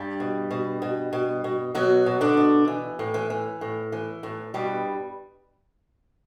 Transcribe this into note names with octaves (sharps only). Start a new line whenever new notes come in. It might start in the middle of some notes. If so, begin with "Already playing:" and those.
Already playing: G2 G3
B2
B2
B2
B2
B2
B2 F#3 F#4
B2
D3 D4
B2
E3
A2
E3
E3
A2
E3
A2
G2 B2 G3